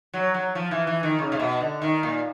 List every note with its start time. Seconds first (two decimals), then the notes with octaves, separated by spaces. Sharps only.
0.14 F#3
0.34 F#3
0.55 F3
0.71 E3
0.87 E3
1.03 D#3
1.19 C#3
1.32 C3
1.39 B2
1.61 D3
1.82 D#3
2.03 A#2